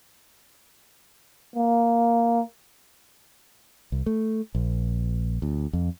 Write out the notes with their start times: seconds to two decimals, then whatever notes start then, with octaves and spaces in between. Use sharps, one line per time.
1.56 A#3
3.92 C2
4.06 A3
4.55 A#1
5.42 D2
5.73 F2